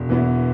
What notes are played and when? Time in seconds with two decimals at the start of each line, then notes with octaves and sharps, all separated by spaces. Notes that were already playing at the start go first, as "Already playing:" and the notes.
Already playing: E1
0.09 E2 E3 B3 E4